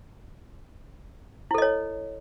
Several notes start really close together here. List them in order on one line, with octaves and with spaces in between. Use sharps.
E4 A4 D#5 C#5